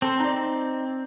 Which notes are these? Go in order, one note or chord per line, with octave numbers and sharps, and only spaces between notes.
C4 A4 C5
D#4 D5